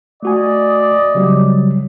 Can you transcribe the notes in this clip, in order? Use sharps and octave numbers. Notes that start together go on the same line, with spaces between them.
A3 F#4 D5 D#5 G#5
C#3 F#3 G3